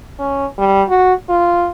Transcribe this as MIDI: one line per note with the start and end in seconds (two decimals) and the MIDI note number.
0.20 0.46 61
0.58 0.83 55
0.89 1.13 66
1.29 1.71 65